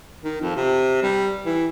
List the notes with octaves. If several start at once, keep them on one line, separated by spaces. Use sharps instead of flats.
D#3
F2
C3
G3
E3